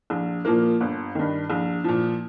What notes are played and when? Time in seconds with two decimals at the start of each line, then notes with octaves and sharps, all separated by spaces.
0.10 A#1
0.45 A#2 F3 A#3
0.80 G1
1.15 G2 D#3
1.50 A#1
1.84 A#2 F3